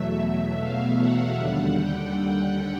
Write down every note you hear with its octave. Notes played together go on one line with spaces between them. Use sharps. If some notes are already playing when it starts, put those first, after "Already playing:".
Already playing: E2 B2 F#3 A3 E5
F5
F#5
D#2 D3 G3
G5